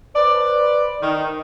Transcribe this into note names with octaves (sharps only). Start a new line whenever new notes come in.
B4 C5 D5
D#3